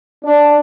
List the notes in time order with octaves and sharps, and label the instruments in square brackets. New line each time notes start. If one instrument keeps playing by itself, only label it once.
[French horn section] D4